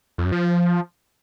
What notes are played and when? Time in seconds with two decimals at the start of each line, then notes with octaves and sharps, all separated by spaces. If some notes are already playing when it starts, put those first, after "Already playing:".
0.18 F2
0.25 F#2
0.32 F3